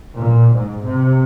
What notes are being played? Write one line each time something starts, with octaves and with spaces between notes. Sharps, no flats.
A#2
G#2
C3